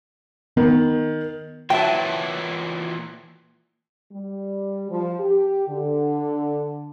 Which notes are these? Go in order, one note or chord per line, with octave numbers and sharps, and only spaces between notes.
D#3 B3
A#2 E3 F#3 E5 G5 A5
G3
F3
G4
D3